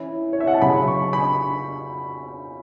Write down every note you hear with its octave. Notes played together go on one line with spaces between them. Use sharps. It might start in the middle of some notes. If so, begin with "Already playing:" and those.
Already playing: E3 C#4 E4
C#5
E5
F#5
A5
C#3 F#3 C#4 B5
C#6
B5